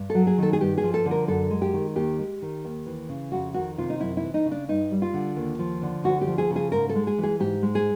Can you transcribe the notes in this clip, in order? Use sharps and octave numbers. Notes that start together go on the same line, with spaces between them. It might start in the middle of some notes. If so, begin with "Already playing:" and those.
Already playing: G2
F#3 A4
G#4
D#3 A4
G#4
G2 G4
G#4
F3
A4
D3
A#4
F#2 A4
G#3
G4
D#3
D#2 G4
G#3
D#3
D#2
E3
C#3
F2 F#4
D#3 F#4
C3 F4
D#4
F#2 E4
E4
E3
D#4
C#3
D4
G2 D#4
G3
F4
D3
D#2
F3
D3
D2 F#4
G4
F3
G#4
C#3
G#4
G#2 A#4
A4
G#3
G#4
E3 G#4
G#2 G4
G#3
G#4